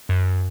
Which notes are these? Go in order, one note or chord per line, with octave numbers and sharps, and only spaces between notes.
F#2